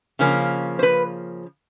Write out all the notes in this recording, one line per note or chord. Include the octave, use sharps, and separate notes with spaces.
C#3 F3 A#3 C#4
C5
B4